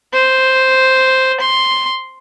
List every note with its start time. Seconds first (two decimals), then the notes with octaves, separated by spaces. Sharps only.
0.13 C5
1.40 C6